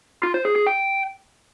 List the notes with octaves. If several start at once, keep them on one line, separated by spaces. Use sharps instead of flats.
F4
C5
G#4
G#4
G5